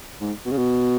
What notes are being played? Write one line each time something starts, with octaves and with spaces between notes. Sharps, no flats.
G#2
B2
C#3
B2